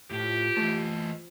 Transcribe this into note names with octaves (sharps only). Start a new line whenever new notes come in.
A2 F3 G4
E3 A3 D#5 A5